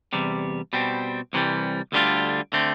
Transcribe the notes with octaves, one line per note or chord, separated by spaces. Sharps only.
E2 C3 G3
B2 G3 C4
C2 C3 E3 G3
D2 D3 G3 D4 F4
D3 A3 C4